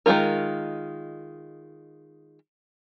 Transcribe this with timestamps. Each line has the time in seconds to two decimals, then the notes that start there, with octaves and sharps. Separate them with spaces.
0.06 D#3 G#3 A#3 F4 A#4